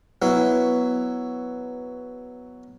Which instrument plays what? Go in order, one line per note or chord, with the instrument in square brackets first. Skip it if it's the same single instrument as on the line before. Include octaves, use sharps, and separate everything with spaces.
[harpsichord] F#3 B3 E4